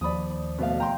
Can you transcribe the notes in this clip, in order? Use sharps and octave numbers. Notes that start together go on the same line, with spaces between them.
D#2 F3 D5 B5 D#6
B2 A3 F5
G5 A#5 C6